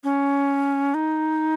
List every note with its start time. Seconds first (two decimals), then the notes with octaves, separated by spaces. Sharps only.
0.04 C#4
0.94 D#4